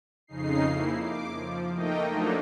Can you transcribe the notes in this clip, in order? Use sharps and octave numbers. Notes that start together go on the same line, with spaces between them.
F2 C#3 D#4 C7
A#3 E4
D6
F3
A3 A#3 D#4 D#5 G5
F3 F#3 A3 A#3 D4 D#4